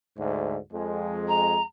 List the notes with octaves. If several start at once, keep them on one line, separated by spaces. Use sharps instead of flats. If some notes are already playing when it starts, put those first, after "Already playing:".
D2 G#2
F2 G#3
A#5